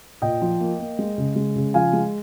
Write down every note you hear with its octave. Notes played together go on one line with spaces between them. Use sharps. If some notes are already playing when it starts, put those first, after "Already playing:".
A#2 D#5 G5
F3
A#3
A#3
G#3
C#3
G#3
C#3
F3 F5 G#5
G#3